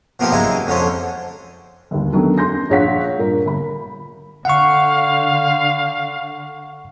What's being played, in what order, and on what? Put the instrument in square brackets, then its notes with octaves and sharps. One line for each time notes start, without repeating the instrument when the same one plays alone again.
[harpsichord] F3 A#3 B3 D#4 G4 C5
C#3 F#3 G#3 D#4 E4
F2 D3 C#4 C5
[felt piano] G1 D#2
D3 D#3 F#3 A3 B3 C#4
C#4 C6 G6 A#6
A#1 G#4 C#5 F5 F#5 B6
G2 A#2 A#3 A#4
G1 B5
[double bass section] D3 [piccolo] F5 [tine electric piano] F#5 C#6